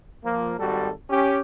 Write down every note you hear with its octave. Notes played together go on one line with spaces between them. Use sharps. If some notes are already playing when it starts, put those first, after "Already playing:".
F3 A#3
G#1 G3 F#4 A4
C#4 G4